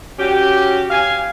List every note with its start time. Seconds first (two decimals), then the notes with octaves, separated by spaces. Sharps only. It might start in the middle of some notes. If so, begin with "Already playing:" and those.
0.19 C#4 F#4 G4
0.90 F5 G#5